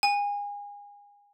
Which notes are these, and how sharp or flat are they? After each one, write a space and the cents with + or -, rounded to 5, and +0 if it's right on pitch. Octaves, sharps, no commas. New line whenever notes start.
G#5 -30